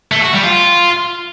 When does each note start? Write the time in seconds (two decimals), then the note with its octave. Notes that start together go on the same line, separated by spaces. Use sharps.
0.12 A3
0.22 F#4
0.33 G3
0.44 F4